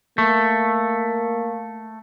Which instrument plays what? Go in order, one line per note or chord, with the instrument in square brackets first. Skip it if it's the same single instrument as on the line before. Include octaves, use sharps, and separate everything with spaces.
[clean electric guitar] A3 [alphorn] A#3